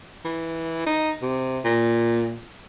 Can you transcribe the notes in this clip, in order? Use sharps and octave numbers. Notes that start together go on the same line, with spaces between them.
E3
D#4
C3
A#2